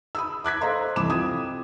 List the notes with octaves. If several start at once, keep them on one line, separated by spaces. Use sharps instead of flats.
B5 D#6 E6
D6 F#6 G#6 B6
A4 C5 D#5 F5 A#5 C6
C2 F2 E3 B5 D6 E7
C4 F4 D#6 G#6